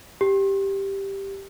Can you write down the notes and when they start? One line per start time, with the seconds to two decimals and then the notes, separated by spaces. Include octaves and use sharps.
0.21 G4